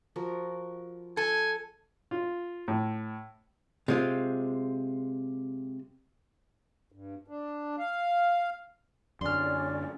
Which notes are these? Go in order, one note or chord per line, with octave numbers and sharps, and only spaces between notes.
F3 F#4 A#4
A4 G#5
F4
A2
C3 G#3 F4
G2
D4
F5
F#2 D3 C#4 D5 C6 F6